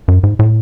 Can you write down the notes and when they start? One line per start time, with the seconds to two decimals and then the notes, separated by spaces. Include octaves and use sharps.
0.08 F#2
0.23 G#2
0.39 A2